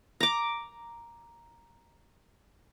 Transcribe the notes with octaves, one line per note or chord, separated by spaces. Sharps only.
A#5 D6